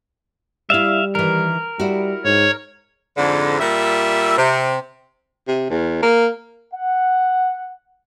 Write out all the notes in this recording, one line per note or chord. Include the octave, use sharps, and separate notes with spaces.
G3 E4 D5 E5 F5
D#3 E3 A#4
G3 E4 F#4
G#2 C#5
F2 G#2 D3
A#2 G3 E5
C3
C3
E2
A#3
F#5